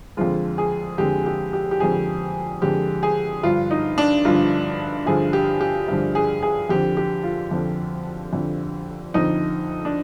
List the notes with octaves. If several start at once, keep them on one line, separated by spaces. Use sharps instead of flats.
F2 D3 F3 G#3 F4
G#4
F2 D3 F3 G#3 G4
G4
G4
G4
F2 D3 F3 G#3 G#4
F2 D3 F3 G#3 G4
G#4
G2 D3 F3 F4
D#4
D4
G2 D3 F3 F4
G2 D3 F3 G#4
G4
G4
G2 D3 F3
G#4
G#4
F2 D3 F3 G4
G4
F4
F2 D3 F3
F2 D3 F3
F2 D3 F3 D#4
D4